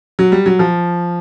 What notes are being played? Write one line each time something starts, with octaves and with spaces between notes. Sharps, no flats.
F#3
G3
F#3
F3